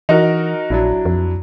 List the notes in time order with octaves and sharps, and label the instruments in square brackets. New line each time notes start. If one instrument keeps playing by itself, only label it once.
[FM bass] E3 [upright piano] D#4 F#4 A#4
[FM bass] A#1 [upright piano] F#3 D4 E4
[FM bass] F2